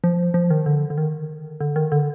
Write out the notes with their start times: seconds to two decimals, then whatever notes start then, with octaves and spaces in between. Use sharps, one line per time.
0.04 F3
0.34 F3
0.50 D#3
0.66 D3
0.90 D3
0.98 D#3
1.60 D3
1.76 D#3
1.92 D3